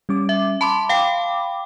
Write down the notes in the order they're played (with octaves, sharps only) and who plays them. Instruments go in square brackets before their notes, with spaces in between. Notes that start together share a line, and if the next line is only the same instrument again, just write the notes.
[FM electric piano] G3 C#4 D6
[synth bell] E5
[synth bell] A5 C6 [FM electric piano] B5 D6
[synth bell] F5 G5